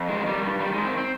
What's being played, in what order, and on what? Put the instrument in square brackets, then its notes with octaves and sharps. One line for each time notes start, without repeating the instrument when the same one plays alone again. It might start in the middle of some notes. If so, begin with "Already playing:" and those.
Already playing: [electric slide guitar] F2
D#3 G#3
D#3 G3
G2 G3
D#3 G3
D#3 G#3
C4
C4